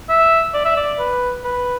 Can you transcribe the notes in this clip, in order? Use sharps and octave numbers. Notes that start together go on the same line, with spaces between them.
E5
D5
E5
D5
B4
B4